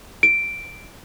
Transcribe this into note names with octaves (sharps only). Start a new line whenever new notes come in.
D7